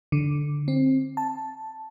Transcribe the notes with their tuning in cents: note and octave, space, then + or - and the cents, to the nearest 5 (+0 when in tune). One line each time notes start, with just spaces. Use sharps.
D3 -5
C4 +15
A5 +0